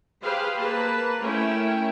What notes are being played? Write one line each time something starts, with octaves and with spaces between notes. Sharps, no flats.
G4 G#4 B4 C5 F5
A#3 B4 A5
A3 C#4 E4 A#4 G5